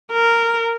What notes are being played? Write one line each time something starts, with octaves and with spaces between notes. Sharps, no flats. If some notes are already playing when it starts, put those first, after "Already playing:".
A#4